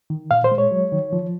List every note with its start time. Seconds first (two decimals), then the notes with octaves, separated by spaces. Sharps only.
0.10 D#3
0.31 A#2 F5
0.44 C5
0.52 G#3
0.58 C#5
0.71 F#3
0.92 D#3
1.13 F3